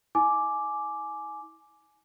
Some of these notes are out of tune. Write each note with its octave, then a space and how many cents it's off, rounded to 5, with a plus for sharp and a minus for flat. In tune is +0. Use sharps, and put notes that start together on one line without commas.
E4 -40 G#5 +20 D6 +0